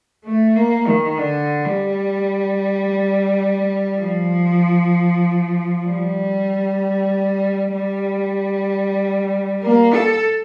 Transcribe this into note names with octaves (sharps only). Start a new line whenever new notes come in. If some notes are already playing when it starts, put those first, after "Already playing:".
A3
A#3
D#3
D3
G3
F3
G3
G3
A#3
A4